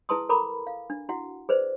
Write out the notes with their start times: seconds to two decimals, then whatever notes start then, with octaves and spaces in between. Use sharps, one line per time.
0.09 E4 G#4 B4 A5 C6 D#6
0.29 A4 A#4 A#5 B5 D6
0.67 F5
0.90 D4
1.09 E4 F#4 F#5
1.49 G#4 B4 C5 D5